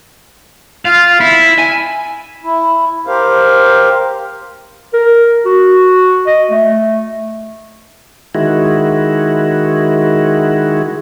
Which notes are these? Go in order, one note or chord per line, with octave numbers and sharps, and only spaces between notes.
F4 F5
E4 B5
G#5
E4
G4 A#4 C5 F5
A#4
F#4
D#5
A3
D#3 G#3 E4 F#4